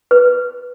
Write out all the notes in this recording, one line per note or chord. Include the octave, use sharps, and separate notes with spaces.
B4